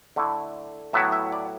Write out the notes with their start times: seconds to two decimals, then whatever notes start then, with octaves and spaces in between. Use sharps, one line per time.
0.16 D3 A3 E4
0.93 A2 F#3 B3 E4 E5
1.12 E5
1.32 D5